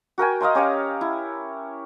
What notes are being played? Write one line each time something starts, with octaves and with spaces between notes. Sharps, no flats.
F#4 A#4 G5 G#5
D#5 F5 A#5 C6
C#4 G4 C#5 F5
E4